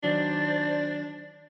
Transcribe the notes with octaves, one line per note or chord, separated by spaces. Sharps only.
D#3 F#3 D4 C5 D5